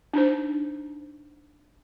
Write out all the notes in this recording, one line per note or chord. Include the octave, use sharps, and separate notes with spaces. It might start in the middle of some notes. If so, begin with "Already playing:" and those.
D4 D#4 C5